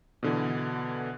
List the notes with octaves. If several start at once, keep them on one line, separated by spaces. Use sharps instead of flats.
B2 D3 E3